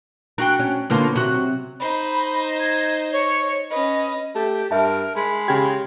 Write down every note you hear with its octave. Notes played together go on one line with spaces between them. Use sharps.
D4 F#4 A#4 G5
C#4
A2 D3 A#3 B3 F4 C#5
C3 F#3 F#4
D#4 C5 B5
G#6
C#5
C#4 B4 D#5
A3 G4
G2 A#4 E5 A5
G#3 B5
C#3 G4 G5 G#6